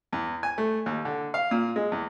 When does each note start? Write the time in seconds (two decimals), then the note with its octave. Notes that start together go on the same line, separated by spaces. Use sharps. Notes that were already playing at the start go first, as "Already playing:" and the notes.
0.13 E2
0.43 G#5
0.58 A3
0.86 D#2
1.05 D3
1.34 F5
1.51 A#2
1.76 G#3
1.92 E2